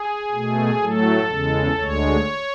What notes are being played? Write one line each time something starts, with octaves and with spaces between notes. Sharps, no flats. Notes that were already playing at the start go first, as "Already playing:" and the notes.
Already playing: G#4
B2 A3
A2 F#3 A3 A4
E2 C#3 G#3
D2 D3 G#3 C#5